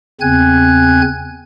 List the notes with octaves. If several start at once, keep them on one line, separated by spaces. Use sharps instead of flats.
E2 C#3 C4 G#5 F#6 G#6